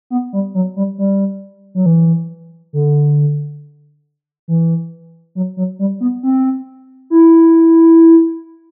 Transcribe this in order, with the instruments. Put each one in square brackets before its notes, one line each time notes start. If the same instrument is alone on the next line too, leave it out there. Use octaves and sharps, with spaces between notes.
[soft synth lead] B3
G3
F#3
G3
G3
F#3
E3
D3
E3
F#3
F#3
G3
B3
C4
E4